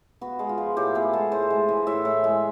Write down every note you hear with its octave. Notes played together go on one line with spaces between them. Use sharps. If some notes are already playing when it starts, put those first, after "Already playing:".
B3 F#4
G#3
F4
F3
A2 G4
B3 G#4
G#3 A4
A2 C5
G#3
E3
A2 E5
A2
G#3